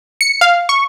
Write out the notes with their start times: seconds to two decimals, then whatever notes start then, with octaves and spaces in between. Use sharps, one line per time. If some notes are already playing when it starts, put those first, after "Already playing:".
0.21 C#7
0.41 F5
0.69 C#6